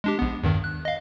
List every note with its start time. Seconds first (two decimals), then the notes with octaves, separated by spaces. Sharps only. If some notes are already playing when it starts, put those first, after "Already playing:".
0.04 G#3 D4 G4
0.19 A#1 B3
0.43 E2 G2 D#3
0.64 F#6
0.85 D#5 F5